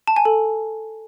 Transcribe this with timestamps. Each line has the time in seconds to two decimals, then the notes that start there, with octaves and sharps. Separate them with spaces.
0.07 A5
0.16 G#5
0.25 A4